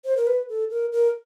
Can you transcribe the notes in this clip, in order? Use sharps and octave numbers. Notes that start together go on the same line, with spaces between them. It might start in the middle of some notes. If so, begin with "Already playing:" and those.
C5
A#4
B4
A4
A#4
A#4